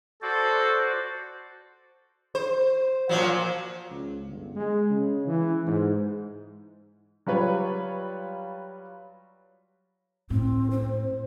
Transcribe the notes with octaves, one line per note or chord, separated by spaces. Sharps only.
F#4 A4 C5 D5
C5
A#2 F3 F#3
C#2
G1
G#3
C#3
E3
G#2
F#3 G3 F4 B4 C#5
A2 C4
C5